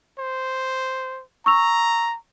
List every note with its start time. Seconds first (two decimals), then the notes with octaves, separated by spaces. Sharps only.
0.19 C5
1.46 A#5 C#6 E6 F7